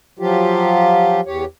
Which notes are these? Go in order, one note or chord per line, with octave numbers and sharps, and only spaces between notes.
F3 F#3 F4 G4
E2 G4 C#5